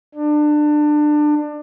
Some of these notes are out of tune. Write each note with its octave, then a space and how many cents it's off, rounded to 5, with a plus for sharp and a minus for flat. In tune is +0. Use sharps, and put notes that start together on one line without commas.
D4 +25